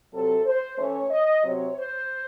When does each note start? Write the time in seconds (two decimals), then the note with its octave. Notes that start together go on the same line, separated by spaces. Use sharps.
0.12 C3 F#3 C4 A4
0.45 C5
0.78 E3 A3 C#4 C#5
1.10 D#5
1.44 C3 F#3 C4 C#5
1.77 C5